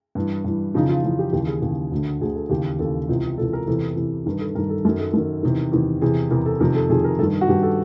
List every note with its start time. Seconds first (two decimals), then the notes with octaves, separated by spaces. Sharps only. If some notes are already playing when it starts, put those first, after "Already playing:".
0.15 G2 E3
0.44 G2 E3
0.74 F2 C#3 E3 D#4
0.89 F4
1.04 F2 C#3 E3
1.19 G4
1.32 D#2 C#3 E3 G4
1.47 G#4
1.62 D#2 C#3 E3
1.92 D2 D3
2.21 D2 G#4
2.24 D3
2.35 A4
2.50 D#2 C#3 E3 G4
2.79 D#2 C#3 E3 A4
3.09 C#2 C3 E3
3.38 C#2 C3 E3 A4
3.53 A#4
3.67 E2 C3 E3 A4
3.96 E2 C3 E3
4.26 G2 D#3 A#4
4.40 A4
4.55 G2 A#4
4.58 D#3
4.69 A4
4.85 F#2 A4
4.88 D#3
5.00 A4
5.14 F#2 D#3
5.43 E2 C3 D#3
5.72 E2 C3 D#3
6.01 E2 C3 E3 G#4
6.31 E2 C3 E3 A#4
6.46 A4
6.60 F2 C3 D#3 A#4
6.75 A4
6.90 F2 C3 D#3 G#4
7.04 A#4
7.19 G2 D#3 A4
7.41 F#4
7.48 G2 D#3 G4
7.63 A4